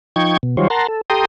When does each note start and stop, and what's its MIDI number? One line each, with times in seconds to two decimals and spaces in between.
0.16 0.37 53
0.16 0.37 63
0.16 0.37 79
0.16 0.37 85
0.16 0.37 92
0.43 0.56 47
0.57 0.68 51
0.57 0.68 54
0.57 0.68 55
0.57 0.68 65
0.57 0.68 72
0.57 0.68 73
0.70 0.87 70
0.70 0.87 78
0.70 0.87 81
0.70 0.87 82
0.70 0.87 84
0.88 1.01 69
1.10 1.25 67
1.10 1.25 69
1.10 1.25 79
1.10 1.25 82
1.10 1.25 84
1.10 1.25 87